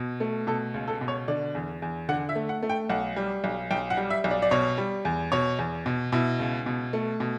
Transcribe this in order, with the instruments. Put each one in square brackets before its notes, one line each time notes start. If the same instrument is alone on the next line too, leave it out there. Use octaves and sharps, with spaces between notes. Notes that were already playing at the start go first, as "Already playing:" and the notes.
Already playing: [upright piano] B2
A3
B2 A4
C#2
A4
B2
C#5
D3 D5
E2
E2
D3 F#5
E5
A3
F#5
A3
G5
B1 F#5
G3
B1
B1 G5
F#5
G3
E5
B1
D5
D5
B2 C#5
G3
E2
B2 C#5
E2
B2
B2 E4
C#2
B2
A3
B2